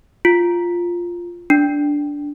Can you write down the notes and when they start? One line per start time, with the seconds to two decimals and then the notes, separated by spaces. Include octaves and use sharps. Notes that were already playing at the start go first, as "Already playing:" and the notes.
0.25 F4
1.50 D4